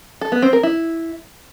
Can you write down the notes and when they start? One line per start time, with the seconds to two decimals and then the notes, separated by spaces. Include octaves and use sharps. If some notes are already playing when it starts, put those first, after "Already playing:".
0.21 A4
0.32 B3
0.42 C4
0.53 A#4
0.63 E4